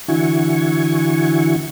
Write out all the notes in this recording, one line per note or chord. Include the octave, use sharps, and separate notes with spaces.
D3 E3 E4 F#4 G#5 C#6